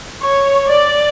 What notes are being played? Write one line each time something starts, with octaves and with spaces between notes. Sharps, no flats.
C#5
D5